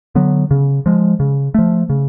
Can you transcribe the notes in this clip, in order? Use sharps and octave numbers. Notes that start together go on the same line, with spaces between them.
D3 F#3 B3
C#3
F3 G#3
C#3
F3 A3
C#3